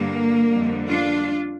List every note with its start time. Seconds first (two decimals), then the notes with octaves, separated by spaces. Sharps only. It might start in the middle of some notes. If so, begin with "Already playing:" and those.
Already playing: G2 D3 G3 A#3
0.48 F2 D3 G3
0.90 D4 F4